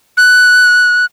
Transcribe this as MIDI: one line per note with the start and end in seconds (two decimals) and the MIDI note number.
0.17 1.05 90